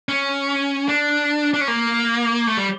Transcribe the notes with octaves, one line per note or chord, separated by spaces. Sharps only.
C#4
D4
D4
C#4
A#3
A3
G3